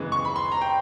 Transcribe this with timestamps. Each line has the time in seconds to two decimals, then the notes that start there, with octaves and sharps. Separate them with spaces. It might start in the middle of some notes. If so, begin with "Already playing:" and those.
Already playing: F#2 C#3 E3 G#3 B3
0.12 C#6
0.25 B5
0.36 C6
0.52 A#5
0.61 G5